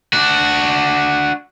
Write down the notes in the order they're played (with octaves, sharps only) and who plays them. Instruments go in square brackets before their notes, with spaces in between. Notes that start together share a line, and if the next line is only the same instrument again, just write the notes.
[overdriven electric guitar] D4 F#4